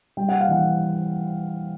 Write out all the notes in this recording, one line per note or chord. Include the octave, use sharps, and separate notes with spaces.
G3 G5
F#5
F5
E3 F#5